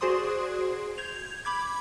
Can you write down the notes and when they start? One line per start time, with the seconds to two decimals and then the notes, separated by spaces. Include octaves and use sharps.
0.01 F#4 G#4 C5 D5 C6 D#6
0.98 G6 G#6 F7
1.45 B5 D6 G#6